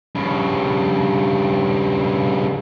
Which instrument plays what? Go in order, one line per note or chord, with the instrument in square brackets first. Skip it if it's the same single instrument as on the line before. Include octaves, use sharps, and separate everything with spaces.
[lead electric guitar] G2 C#3